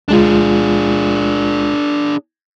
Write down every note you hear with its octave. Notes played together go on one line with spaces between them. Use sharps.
D2 G#3 D4 F4 G#4